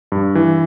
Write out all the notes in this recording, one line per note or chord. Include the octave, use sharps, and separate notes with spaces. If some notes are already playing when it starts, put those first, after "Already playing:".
G2
E3